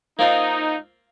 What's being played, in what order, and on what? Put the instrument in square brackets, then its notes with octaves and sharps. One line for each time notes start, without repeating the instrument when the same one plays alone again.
[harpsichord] A#3 C4 F4 [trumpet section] D#4